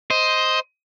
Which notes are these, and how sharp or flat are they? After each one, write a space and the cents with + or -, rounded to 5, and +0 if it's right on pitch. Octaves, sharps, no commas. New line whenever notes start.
C5 +0 D#5 +10